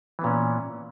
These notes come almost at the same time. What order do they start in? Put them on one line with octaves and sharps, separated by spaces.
E3 B3 A#2 C#4